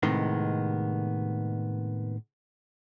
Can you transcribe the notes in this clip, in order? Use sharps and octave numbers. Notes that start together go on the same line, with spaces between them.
A2 C3 D#3 G#3 B3